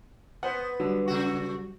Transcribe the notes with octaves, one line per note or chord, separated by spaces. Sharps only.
B3 C5 F#5
D3 F#3 G3
C#3 F#4